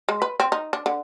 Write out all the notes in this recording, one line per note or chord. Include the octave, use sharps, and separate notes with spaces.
G#3
B4
C4
D#4
D4
D3